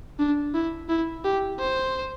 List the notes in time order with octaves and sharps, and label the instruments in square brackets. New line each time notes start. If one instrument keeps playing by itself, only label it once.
[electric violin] D4
E4
E4
G4
C5